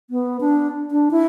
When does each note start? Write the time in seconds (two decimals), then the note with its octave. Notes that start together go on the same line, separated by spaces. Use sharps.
0.10 B3
0.41 D4
0.91 D4
1.11 E4